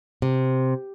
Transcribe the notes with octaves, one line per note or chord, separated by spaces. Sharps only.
C3